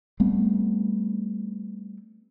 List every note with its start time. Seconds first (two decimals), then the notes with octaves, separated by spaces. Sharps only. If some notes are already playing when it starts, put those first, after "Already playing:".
0.20 G3 A3 B3 C4